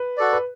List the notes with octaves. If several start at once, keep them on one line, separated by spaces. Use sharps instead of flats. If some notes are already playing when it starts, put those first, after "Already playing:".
Already playing: B4
F#4 A4 D5
B4